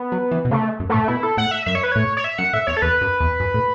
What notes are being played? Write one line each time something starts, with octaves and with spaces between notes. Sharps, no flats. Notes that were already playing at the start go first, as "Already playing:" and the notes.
Already playing: B3
F#3
E3
B2
C#3 A3
F#2
A2 A3
B2 E4
A4
A2 F#5
E5
F#2 E5
C#5
B4
A2 C#5
C#5
E5
F#2 F#5
A2 E5
E2 C#5
A4
E2 B4
F#2
E2
F#2
A2